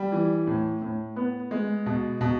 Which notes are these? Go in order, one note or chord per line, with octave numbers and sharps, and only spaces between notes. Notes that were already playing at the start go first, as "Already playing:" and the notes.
Already playing: G3
E3
A2
A2
B3
G#3
B2
B2